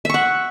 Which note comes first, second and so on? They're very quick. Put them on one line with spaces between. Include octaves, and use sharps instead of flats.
E5 C#6 F#5